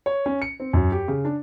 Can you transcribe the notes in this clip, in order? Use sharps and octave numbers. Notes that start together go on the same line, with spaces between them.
C#5
C#4
C#7
C4
F#2
G4
C#3
D4